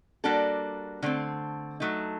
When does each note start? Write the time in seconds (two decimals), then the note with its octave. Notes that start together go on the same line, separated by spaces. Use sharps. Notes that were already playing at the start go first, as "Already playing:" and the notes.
0.24 G3 A#3 D4 F#4 A4
1.02 D3 A3 C4
1.80 F#3 A3 D#4